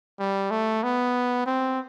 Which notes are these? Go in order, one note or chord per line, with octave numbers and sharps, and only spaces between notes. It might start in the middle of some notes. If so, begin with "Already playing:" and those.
G3
A3
B3
C4